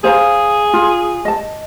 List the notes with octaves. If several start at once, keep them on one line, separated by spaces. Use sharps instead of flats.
G#4 C5 F5 A#5
F4
D#5 A5